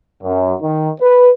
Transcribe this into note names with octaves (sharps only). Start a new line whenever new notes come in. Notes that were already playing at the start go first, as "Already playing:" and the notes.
F#2
D#3
B4